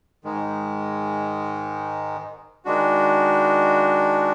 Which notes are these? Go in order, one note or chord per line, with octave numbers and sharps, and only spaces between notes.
G#2 D#3 G#3
D#3 G#3 D4 F#4